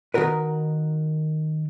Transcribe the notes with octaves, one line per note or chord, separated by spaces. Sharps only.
D#3 D#4 F#4 A#4 B4